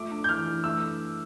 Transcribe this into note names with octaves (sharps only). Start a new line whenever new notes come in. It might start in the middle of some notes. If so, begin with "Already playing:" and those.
Already playing: F3 A3 D6
D4
G6
E3 F6
E3
A3 E6